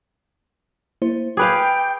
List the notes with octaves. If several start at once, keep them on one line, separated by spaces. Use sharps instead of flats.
A#3 E4 C5
G#4 B4 F5 G5 D6